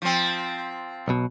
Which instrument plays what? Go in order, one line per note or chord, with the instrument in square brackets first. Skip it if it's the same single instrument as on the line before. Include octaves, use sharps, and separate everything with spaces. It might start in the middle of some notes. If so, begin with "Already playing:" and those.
[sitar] F3 C4
[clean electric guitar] B1 B2